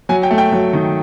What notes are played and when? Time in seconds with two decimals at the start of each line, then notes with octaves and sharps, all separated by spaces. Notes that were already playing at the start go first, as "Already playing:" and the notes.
0.09 F#3 G#5
0.23 G5
0.31 A3
0.38 G5
0.52 F#3
0.73 D#3